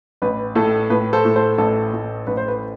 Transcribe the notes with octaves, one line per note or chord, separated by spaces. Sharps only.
A1 B4
A2 A4
A2 B4
A4 C5
A2
A4 C5
A1 A4
A2
A1 B4
C5
B4